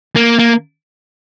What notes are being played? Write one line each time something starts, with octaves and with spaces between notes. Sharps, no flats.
A#3
A#3